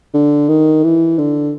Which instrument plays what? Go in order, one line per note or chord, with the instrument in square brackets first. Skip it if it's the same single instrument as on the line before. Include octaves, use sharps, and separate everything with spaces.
[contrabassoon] D3
D#3
E3
D3